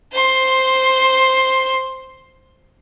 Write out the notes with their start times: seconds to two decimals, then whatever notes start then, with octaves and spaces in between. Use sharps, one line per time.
0.12 C5 C6